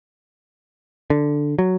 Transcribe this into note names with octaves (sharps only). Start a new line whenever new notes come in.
D3
F#3